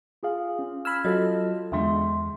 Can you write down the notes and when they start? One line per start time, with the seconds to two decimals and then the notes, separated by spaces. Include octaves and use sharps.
0.23 F4 G#4 F5
0.59 C#4
0.85 B5 E6 F6 G#6
1.05 F#3 F4 A4 D#5
1.72 E2 D3 G#3 E5 C6